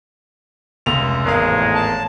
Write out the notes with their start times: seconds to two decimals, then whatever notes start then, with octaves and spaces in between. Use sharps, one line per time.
0.86 F1 C#2 F7
1.25 G#1 E2 A2 G#3 A#4 F5
1.74 A5